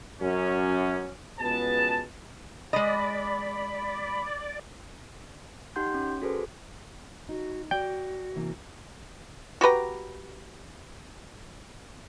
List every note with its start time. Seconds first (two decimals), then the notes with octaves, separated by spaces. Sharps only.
0.20 F#2 C#4
1.40 C#2 B2 B3 G#4 B4 A5
2.73 G#3 D5 D#5 B5
5.76 D#4 G4 F#5 C6 G6
5.94 C#4
6.22 F#4 G#4 A4 B4 C5
7.29 D#4 F#4
7.71 F#4 D5 G5
8.35 C3 E3 A#3
9.61 F#4 G4 B4 A#5